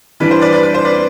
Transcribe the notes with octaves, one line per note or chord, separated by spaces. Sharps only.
E3 G3 D4 B4
C5
B4 D5
B4 D5
B4
C5
B4 D5